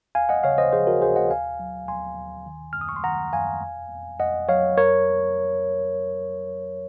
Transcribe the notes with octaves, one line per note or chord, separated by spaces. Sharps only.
D#2 F5 G#5
D#5 F#5
C#3 C#5 F5
C5 D#5
F3 G#4 C5
F#4 A#4
D#2 G#4 C5
D#5 F#5
D#2 F5 G#5
F#3
D#2 G#5 C6
D#2
D#3
F#2 F6
D#6
C#6
C6
D#3 F#5 A#5
F#2 F5 G#5
F2
F2
F2 D#5 F#5
F#3 C#5 F5
F2 A#4 C#5